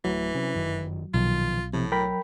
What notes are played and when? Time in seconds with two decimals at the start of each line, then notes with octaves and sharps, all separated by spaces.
0.05 D1 E3 F#3 A3
0.34 C3 C#4
0.55 G1 F#2 D#3
1.14 B1 A#2 D#3 F3 F4
1.73 A2 C3 F3
1.92 F#3 A#4 G5 B5